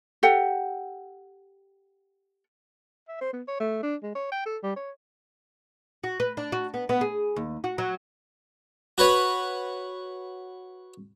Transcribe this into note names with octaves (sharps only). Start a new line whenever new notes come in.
G4 A4 F#5 G5
E5
C5
B3
C#5
A3
D4
G#3
C#5
G5
A4
G3
C#5
F#4
B4
D4
F#4
B3
B3
G#4
D#2
F#4
F#3
F#4 B4 C#5